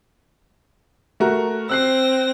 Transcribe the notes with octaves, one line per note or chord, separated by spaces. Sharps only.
A3 F#4 A#4
C4 E6 F#6 A#6 C7